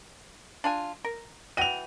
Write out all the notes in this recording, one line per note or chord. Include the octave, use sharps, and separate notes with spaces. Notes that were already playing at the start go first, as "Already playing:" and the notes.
D4 F4 G#5
A#4
E3 F#4 G5 D#7 F7